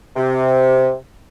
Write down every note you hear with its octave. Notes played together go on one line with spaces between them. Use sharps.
C3